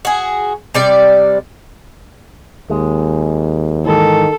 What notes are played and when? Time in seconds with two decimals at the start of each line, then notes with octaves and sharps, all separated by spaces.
0.05 F#4 G#4
0.74 C3 G3 D5
2.70 D#2 G#3
3.86 G#2 D#3 E3 A4